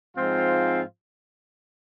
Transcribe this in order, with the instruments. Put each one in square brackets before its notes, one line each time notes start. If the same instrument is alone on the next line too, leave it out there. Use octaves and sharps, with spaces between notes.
[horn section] G#2 F3 C4 F4